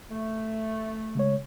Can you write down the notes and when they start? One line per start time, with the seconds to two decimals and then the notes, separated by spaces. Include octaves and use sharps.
0.10 A3
1.15 C#3 G#3 C#5